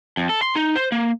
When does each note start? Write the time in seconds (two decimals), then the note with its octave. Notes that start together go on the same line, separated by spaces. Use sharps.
0.17 F2
0.29 A4
0.42 C6
0.55 D#4
0.75 C5
0.92 A#3